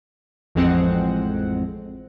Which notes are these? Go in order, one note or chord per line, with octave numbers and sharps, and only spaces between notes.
A1 F2 G#3 C4 F#5